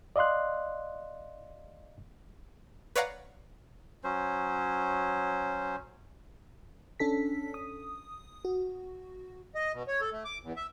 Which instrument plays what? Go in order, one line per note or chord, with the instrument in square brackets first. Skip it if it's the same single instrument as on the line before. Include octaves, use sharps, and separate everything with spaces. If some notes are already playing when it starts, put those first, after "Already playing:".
[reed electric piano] D5 D#5 F5 C6 F#6
[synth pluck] B4 C#5 D5 F5 F#5 A#5
[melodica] F#3 C#4 C5
[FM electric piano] C#4 D4 A4 B6
D#6
F#4
[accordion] D#5
B2
C#5
A4
A3
D6
E2
E5